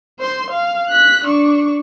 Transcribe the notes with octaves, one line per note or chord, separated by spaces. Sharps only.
C5 C6
F5
F#6 B6
D4 C#6